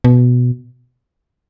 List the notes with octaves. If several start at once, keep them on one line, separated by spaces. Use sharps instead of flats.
B2